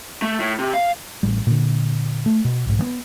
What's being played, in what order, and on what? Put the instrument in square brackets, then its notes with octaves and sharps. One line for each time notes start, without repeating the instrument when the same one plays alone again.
[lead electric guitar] A3
A2
C3
F5
[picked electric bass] A1 G3
A#2 D3
A3
B2
B1 G#2
E3 B3